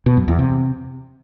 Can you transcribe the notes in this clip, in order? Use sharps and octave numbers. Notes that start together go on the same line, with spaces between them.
B2
F#2
E2
C3